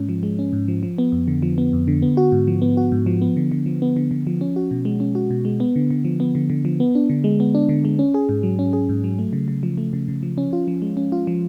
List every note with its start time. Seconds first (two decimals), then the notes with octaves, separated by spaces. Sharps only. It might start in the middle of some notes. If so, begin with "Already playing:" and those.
Already playing: G#2 G#3 C#4
0.09 F3
0.23 G#3
0.39 C#4
0.53 G#2
0.68 F3
0.83 F3
0.98 B3
1.12 F2
1.28 D3
1.42 F3
1.58 B3
1.73 F2
1.88 D3
2.02 B3
2.17 F#4
2.32 G#2
2.48 F3
2.62 B3
2.77 F#4
2.92 G#2
3.06 F3
3.21 B3
3.37 D3
3.52 D3
3.66 F3
3.82 B3
3.96 D3
4.11 D3
4.27 F3
4.41 C#4
4.56 F#4
4.71 B2
4.85 G#3
5.00 C#4
5.15 F#4
5.30 B2
5.45 G#3
5.60 B3
5.76 D3
5.90 D3
6.05 F3
6.20 B3
6.35 D3
6.50 D3
6.65 F3
6.80 B3
6.95 D4
7.10 D3
7.24 G#3
7.40 B3
7.55 D4
7.69 D3
7.85 G#3
7.99 C#4
8.14 G#4
8.29 G#2
8.43 F#3
8.59 C#4
8.73 G#4
8.89 G#2
9.04 F#3
9.19 A3
9.33 C#3
9.48 C#3
9.63 F3
9.78 A3
9.93 C#3
10.08 C#3
10.23 F3
10.38 C#4
10.53 F4
10.68 F3
10.82 G#3
10.97 C#4
11.12 F4
11.27 F3